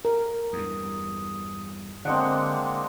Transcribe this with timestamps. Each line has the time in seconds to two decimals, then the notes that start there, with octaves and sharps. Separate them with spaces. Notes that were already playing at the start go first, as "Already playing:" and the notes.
0.05 A#4
0.53 E2 G2 D#6
2.05 D3 G#3 A#3 C4 D4 D#5 F#5